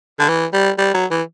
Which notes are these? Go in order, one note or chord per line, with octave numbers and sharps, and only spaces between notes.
D3
E3
G3
G3
F#3
E3